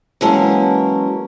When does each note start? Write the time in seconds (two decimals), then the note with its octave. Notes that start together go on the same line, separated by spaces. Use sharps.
0.21 E3 F#3 G#3 A#3 C#4 A5